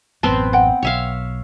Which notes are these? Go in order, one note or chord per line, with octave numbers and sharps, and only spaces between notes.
A1 F#2 B3 C4 A5
F#5 G5
B1 C#5 E5 F5